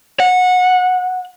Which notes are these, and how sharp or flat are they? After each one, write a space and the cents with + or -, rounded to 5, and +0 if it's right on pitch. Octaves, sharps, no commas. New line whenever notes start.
F#5 -20